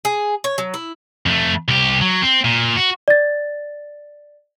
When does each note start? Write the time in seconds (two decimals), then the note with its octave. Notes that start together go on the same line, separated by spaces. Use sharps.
0.05 G#4
0.44 C#5
0.58 F#3
0.74 E4
1.26 F2 A3
1.68 C2 G4
2.01 F#3
2.22 C4
2.44 A#2
2.76 F#4
3.08 D5 A6